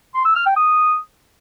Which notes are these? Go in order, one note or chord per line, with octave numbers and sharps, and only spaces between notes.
C6
E6
F6
G5
D#6